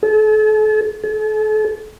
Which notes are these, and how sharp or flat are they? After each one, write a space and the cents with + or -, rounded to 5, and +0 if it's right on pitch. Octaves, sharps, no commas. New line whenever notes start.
A4 -40
A4 -40